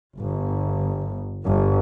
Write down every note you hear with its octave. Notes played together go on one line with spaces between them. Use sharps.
G1
G1